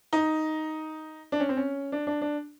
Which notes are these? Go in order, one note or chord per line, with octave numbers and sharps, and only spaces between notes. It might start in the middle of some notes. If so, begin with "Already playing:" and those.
D#4
D4
C#4
C4
C#4
D4
D4
D4